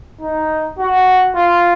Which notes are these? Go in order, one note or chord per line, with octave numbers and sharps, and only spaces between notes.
D#4
F#4
F4